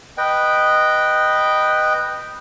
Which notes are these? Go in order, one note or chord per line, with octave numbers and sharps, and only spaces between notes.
B4 D#5 G5